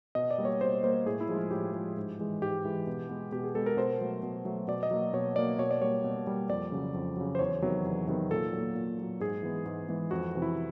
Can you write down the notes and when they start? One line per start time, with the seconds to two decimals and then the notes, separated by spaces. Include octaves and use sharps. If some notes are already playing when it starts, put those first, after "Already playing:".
0.15 B2 D#5
0.31 D5
0.38 G3 A#3
0.45 C#5
0.61 B2 C5
0.83 G3 A#3 C5
1.06 A2 G#4
1.20 E4
1.29 F3 G#3
1.36 F4
1.51 A2 G4
1.73 F3 G#3
1.97 G#2
2.19 E3 G#3
2.42 G#2 G4
2.65 E3 G#3
2.87 B2
3.09 G#3 B3
3.32 B2 G4
3.44 G#4
3.55 G#3 B3 A4
3.66 A#4
3.77 B2 C5
4.01 F#3 A3
4.23 B2
4.45 F#3 A3
4.68 B2 D5
4.83 D#5
4.91 F#3 A#3
5.13 B2 C#5
5.36 F#3 A#3 D5
5.59 B2 C#5
5.71 D5
5.81 G3 A#3 C#5
6.04 B2
6.27 G3 A#3
6.49 F2 D5
6.72 C#3 F#3
6.94 F2
7.16 C#3 F#3
7.35 C5
7.39 E2 C#5
7.62 C3 D#3 F#3 B3
7.85 E2
8.07 C3 D#3 F#3 B3
8.31 A#2 A4
8.53 F#3 A#3
8.75 A#2
8.99 F#3 A#3
9.20 G#2 G#4
9.43 E3 G#3 B3
9.66 G#2
9.88 E3 G#3 B3
10.11 F2 F#4
10.35 C3 E3
10.42 E4